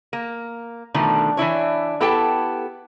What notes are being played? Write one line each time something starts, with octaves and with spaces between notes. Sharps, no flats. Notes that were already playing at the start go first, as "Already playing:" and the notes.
A#3
B2 D3 D#3 F3 A3
E3 D4 E4 C#5
B3 E4 G4 A4 G5 A5